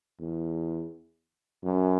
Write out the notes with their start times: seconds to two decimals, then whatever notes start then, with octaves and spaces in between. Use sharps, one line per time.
0.20 E2
1.64 F#2